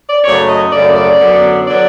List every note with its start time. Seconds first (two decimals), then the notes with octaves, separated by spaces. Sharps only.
0.09 D5
0.24 F#2 C#3 F#3 A3 C#5
0.49 D#5
0.72 F#2 C#3 F#3 A3 D5
0.95 D5
1.20 F#2 D3 F#3 B3
1.68 D3 F#3 B3 D5